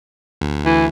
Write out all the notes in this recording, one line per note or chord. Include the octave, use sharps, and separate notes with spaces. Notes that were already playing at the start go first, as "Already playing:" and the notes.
D2
E3